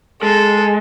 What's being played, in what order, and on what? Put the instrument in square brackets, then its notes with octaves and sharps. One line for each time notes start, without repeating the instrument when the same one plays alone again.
[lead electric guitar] G#3 [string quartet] A4